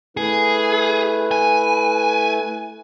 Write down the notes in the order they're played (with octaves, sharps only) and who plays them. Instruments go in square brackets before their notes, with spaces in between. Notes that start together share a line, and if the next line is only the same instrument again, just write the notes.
[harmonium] A3 E4 B4 [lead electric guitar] G#4
[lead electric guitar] G#5